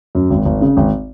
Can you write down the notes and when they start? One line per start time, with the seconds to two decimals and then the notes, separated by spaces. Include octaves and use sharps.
0.15 F#2
0.30 G#1
0.45 G#1
0.61 C#3
0.77 G#1